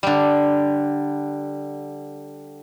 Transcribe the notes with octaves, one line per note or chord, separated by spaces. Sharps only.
D3 G3